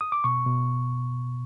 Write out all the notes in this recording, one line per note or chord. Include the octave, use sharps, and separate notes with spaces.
D#6
D6
B2 C#6
B2